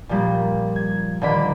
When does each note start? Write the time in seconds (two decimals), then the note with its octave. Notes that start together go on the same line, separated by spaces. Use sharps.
0.09 A#2 F3 G3 A#3
0.76 G#6
1.21 D#1 D3 A#3 D4 B5 D7